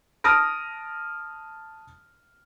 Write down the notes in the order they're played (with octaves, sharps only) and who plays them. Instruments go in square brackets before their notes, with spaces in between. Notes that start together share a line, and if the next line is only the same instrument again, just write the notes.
[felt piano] A5 D#6 F6 A#6 D7